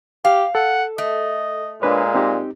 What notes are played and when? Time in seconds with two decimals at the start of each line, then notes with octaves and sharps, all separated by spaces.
0.25 G4 F5
0.55 A4 F#5
0.98 A3 D#5
1.82 A#2 G#3 D4 B4 C#5
2.14 C4 D#4 G4